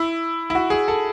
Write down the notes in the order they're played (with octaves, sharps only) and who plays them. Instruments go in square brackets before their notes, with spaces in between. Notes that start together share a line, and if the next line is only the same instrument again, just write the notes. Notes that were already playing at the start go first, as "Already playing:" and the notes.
Already playing: [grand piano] E4
E4
F#4
G#4
A4